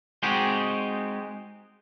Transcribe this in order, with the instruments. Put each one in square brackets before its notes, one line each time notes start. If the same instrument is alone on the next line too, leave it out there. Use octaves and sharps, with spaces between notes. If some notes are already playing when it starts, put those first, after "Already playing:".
[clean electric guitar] G#3 C4 D#4 F#4 G4